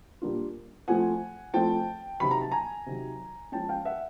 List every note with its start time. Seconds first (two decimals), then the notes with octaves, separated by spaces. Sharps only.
0.22 A#2 G3 A#3 D4 F4
0.88 F3 A3 C4 F4 F#5 G#5
1.54 F3 A3 C4 F4 G5 A5
2.20 C3 D#3 F#3 B5
2.31 A#5
2.41 A5
2.51 G#5 A#5
2.86 C3 D#3 F#3
3.52 F3 G#3 C#4 G5 A5
3.69 F5 G5
3.85 E5 F#5